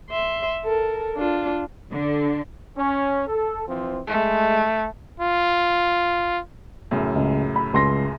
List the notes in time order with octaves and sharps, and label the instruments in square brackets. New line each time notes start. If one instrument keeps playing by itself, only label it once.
[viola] E5 C6
A4 A#4
D4 F4
[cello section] D3
[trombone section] C#4
A4
E3 F3 C4
[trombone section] G#3 [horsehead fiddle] A3
[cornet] F4
[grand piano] F#2 A2 C#3
[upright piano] C#2
B5
C#2 C6 A#6